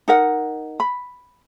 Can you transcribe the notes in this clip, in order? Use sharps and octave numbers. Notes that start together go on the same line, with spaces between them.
D#4 A#4 F#5
B5